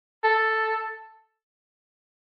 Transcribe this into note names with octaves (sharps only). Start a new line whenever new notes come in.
A4